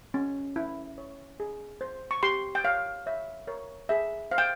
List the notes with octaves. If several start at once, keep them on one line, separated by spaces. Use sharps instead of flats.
C#4
E4
C#5
G#4
C5
C#6
G4 C6
G5
C#5 F5
C#5 E5
A#4 C#5
G#4 E5
C5 F5
G5